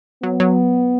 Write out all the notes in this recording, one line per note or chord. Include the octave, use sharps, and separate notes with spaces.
F#3 B3
F#3